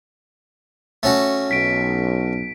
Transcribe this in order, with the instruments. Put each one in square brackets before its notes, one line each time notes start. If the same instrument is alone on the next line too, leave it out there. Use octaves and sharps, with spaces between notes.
[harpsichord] A3 C#4 F#4
[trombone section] B1 [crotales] B6 D7